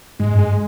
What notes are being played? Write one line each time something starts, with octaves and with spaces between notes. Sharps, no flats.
G#2 G#3
G2
G#3